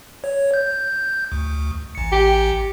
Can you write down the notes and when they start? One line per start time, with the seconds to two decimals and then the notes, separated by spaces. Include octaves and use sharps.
0.24 C#5
0.54 G6
1.32 D2
1.95 A1 C#7
2.12 G4